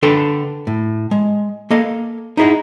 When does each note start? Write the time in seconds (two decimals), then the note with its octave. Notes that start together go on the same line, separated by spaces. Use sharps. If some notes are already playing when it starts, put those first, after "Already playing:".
0.03 D3 D4 A4 B4 G5 C6
0.67 A2
1.11 G#3
1.70 A#3 A4 D#5 F5
2.37 D#4 E4 G#4 D#5 F#5